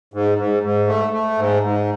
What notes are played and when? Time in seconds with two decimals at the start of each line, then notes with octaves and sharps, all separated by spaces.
0.14 G#2
0.38 G#2
0.63 G#2
0.87 A3
1.13 A3
1.37 G#2
1.63 G#2